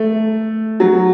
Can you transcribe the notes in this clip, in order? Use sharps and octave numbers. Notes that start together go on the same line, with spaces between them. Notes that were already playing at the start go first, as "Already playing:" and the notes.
Already playing: A3
F#3